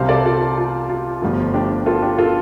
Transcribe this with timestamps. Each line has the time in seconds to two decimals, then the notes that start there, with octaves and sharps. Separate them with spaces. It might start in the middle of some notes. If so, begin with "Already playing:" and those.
Already playing: C2 C3 G3 C5 F5
0.09 A4 D5
0.25 F4 A4
0.41 F4
0.57 F4
0.89 F4
1.22 G1 G2 F3 A3 F4
1.54 D4 G4
1.86 F4 A4
2.02 D4 G4
2.18 F4 A4